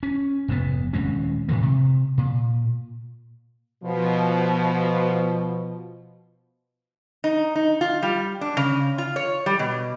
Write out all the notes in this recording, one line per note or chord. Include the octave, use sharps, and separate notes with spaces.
C#4
F1 G#2 C3 B3
D#1 G#3 C4 C#4
A2 D#3 E3 A3
C3
A#2
B2 F3
D#4
D#4
F4
G3
D4
C#3
F4
C#5
G3
B2